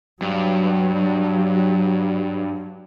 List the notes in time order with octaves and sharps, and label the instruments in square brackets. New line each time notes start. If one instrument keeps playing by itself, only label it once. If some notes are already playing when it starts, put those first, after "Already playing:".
[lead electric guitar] G2 [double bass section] F#3